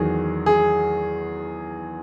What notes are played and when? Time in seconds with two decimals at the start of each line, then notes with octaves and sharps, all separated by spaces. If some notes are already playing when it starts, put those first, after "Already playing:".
Already playing: E2 D#3 F#3 G#4
0.46 G#4